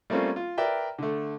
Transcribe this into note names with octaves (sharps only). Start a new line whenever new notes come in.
G3 A3 A#3 C4 C#4 F4
F4
A#4 B4 D5 E5 G5
D3 A3